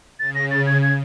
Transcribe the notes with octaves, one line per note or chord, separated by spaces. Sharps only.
C#3 A6
A#6
A6
G#6
G#6